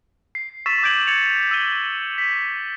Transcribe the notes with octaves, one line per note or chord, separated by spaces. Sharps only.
C7
C#6 E6 A6 B6 E7
D6 G6 G#6 D7 F#7
G#6 A6 C#7 F7
E6 A6 D#7 G7
B6